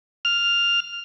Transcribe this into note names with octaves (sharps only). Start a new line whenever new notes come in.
F6